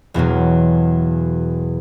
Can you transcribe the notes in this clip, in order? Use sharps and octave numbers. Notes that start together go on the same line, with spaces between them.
E1 E2 B2 F#3